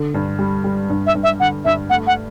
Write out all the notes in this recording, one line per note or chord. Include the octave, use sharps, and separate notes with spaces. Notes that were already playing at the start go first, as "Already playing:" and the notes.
Already playing: D3
G2
G3
G3
G2
E5
G2
E5
D3 F#5
G2 E5
A3 F#5
F#5